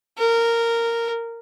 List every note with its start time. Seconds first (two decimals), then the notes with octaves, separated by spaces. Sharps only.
0.18 A#4